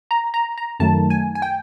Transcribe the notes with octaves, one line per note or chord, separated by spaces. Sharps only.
A#5
A#5
A#5
F#2 D#3 F#3 A3 A5
G#5
G#5
G5